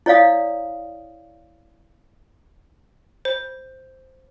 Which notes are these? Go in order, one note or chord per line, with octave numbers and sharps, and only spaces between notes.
E4 C#5 D5 F5 D#6
C5